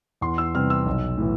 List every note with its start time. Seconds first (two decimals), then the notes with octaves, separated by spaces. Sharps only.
0.21 E2 C6
0.38 E6
0.54 C3 G3 B3 F6
0.70 E6
0.86 B1
1.18 A2 E3